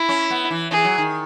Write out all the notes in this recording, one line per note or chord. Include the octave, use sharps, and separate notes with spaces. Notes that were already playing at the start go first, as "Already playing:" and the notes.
Already playing: E4
C#4
B3
E3
E3 G#4
F#3
D#3